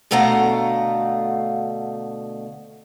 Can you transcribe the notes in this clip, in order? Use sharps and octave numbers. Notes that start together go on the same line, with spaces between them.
D2 B2 A3 F5 F#5 A#5